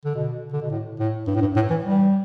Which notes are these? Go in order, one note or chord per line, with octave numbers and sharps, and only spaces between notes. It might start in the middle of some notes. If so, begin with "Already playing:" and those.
D3
B2
D3
B2
A2
A2
G2
A2
G2
A2
E3
G3